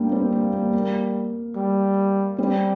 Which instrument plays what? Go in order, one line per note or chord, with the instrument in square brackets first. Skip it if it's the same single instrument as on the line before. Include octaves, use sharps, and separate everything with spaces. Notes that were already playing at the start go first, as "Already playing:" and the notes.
Already playing: [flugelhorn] G3 [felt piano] A#3 D4 G4
[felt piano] C4
A#3
A#3
A#3
[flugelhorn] G3
[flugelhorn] G3 [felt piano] C4